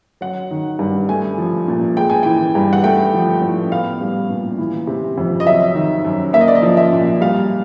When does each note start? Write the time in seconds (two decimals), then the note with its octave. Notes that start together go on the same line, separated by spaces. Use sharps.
0.21 F#3 F#5
0.51 D#3
0.79 G2
1.09 A3 G#5
1.38 F3
1.68 A#2
1.97 G#3 G5
2.10 G#5
2.23 E3 G5
2.55 G2
2.73 F#5
2.83 A3 G5
3.14 F3
3.42 A2
3.71 B3 F5
4.01 G3
4.30 A#2
4.58 E3
4.87 C3
5.18 F2
5.40 D#5
5.46 F#3 E5
5.75 D#3
6.05 F#2
6.33 A#3 E5
6.41 D#5
6.48 D5
6.55 D#5
6.62 F3
6.77 E5
6.93 A#2
7.20 G3 F5